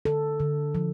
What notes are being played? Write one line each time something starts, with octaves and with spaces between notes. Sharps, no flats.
D3 A4
D3
F3